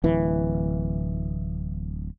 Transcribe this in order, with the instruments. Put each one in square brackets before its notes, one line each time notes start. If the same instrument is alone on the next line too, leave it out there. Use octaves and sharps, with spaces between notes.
[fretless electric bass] D1 E3